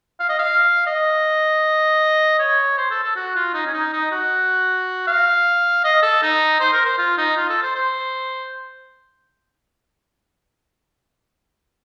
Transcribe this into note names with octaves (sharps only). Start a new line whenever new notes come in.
F5
D#5
F5
D#5
C#5
C5
A4
A4
F#4
F4
D#4
C#4
D#4
D#4
F#4
F5
D#5
A4
D#4
C5
A#4
C5
F4
D#4
F4
A4
C5
C5